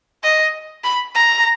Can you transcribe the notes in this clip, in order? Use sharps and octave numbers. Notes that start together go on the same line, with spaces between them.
D#5
B5
A#5